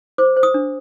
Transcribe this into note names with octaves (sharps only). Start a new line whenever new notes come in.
C5 D6
C5
D#6
D4